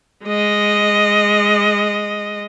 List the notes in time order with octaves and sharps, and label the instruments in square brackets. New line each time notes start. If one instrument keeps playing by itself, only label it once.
[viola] G#3 D#5